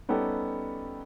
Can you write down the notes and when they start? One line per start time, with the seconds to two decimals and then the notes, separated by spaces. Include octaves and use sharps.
0.09 G3 B3 C#4 D#4 G4 A4